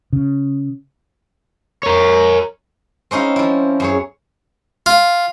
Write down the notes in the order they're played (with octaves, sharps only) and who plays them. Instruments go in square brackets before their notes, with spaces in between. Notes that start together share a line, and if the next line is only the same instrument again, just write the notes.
[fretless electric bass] C#3
[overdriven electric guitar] A#4 C#5
[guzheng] C4 C#4 D#4 E4 F5
F3 E4
F#2 G#4 C#5
[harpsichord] F4